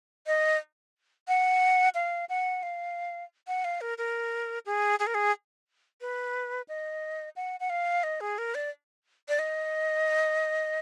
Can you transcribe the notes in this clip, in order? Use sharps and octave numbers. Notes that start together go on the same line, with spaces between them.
D#5
F#5
F5
F#5
F5
F#5
F5
A#4
A#4
G#4
G#4
A#4
G#4
B4
D#5
F#5
F#5
F5
D#5
G#4
A#4
D5
D5
D#5